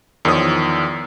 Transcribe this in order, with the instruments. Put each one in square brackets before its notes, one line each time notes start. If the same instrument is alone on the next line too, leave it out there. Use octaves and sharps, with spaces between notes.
[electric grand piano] E2 D#3 F3 C#5 D#6